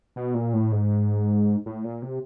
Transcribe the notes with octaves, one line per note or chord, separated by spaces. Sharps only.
B2
A#2
A2
G#2
A2
A#2
C3